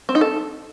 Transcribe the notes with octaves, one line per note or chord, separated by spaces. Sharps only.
C4
D#4
A4